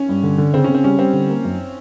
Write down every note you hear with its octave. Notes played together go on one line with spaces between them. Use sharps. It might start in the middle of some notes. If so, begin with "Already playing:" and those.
Already playing: C#4
G2
D3
D3
C#3 C4
C#3 C#4
C4
G3 C#4
G3 C4
D3
A#3
F#2